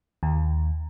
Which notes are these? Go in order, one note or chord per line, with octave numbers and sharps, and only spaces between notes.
D#2